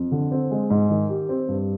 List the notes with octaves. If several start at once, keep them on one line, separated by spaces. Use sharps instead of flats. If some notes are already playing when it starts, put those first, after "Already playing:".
Already playing: F2
D3
C4
G#3
G#2
D#3
G4
C4
G2